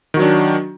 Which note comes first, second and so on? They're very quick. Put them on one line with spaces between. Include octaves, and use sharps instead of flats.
D#3 F#4 F#3 D4